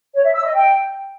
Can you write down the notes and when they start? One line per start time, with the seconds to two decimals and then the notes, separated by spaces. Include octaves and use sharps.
0.13 C#5
0.23 E5
0.33 E6
0.44 D#5
0.54 G5